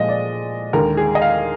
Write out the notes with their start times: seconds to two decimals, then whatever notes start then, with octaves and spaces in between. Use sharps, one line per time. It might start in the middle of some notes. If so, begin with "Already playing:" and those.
Already playing: A#2 F3 G#3 D#5
0.09 D5
0.73 D#2 D3 G#3 A#4
0.97 G#4
1.15 D#5
1.22 F5